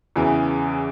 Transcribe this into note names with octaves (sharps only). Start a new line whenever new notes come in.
E2 C#3 E3